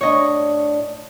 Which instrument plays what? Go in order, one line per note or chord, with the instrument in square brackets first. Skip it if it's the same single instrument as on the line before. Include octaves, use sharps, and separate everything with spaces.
[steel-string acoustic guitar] A2 D4 [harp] C#5 D#5